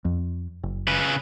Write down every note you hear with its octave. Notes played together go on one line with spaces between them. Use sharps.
F2
F#1
C#3 B4